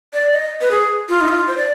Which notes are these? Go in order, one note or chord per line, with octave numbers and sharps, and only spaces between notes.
D5
D#5
B4
G#4
F4
D#4
F4
C5
D5